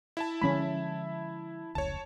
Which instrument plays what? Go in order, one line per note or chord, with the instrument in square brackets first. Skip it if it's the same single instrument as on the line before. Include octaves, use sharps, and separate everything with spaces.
[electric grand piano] E4 E5 A5
[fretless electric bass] D3 F3 G#3 [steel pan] C#4 B5
[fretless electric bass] F1 C#2 [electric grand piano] C#5 A5